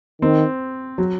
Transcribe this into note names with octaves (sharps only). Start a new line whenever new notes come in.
D#3 C4
F#3